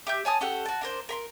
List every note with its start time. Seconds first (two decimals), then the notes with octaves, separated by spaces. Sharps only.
0.07 G4 E5 G6
0.25 C#5 G#5 A5 D#6
0.41 C#4 G4 A4 F#5
0.66 F#4 A5
0.81 D4 A#4 C5
1.09 A#4 B5 C6